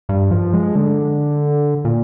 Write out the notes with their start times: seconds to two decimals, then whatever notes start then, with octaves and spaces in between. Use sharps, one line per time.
0.09 G2
0.31 F3
0.53 G#3
0.76 D3
1.85 A#2